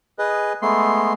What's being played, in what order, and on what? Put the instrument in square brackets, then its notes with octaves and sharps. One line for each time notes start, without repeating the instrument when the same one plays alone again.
[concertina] G#4 B4 D#5
G#3 A3 B3 C6